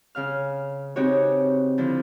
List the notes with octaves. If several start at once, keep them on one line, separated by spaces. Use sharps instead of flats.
C#3 F5 F6
C#3 C4 D#4 F#4 G4 C#5
D3 F3 D4 E4